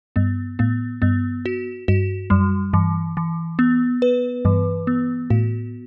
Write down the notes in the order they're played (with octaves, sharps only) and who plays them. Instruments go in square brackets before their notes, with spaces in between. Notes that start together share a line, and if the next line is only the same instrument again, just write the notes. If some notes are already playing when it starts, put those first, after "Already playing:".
[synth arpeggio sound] G2 [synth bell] B3
[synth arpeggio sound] A2 [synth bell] B3
[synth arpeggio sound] G2 [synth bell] B3
[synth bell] F#4
[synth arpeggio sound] G2 [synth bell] F#4
[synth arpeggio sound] F#2 [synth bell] G3
[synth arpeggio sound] G2 [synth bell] E3
[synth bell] E3
B3
B4
[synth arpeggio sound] G2 [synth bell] E3
[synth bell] B3
[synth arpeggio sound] A2 [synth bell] F#4